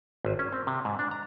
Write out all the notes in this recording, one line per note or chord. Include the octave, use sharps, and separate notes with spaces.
G#1
C#4
C4
C3
G#2
D4
A#5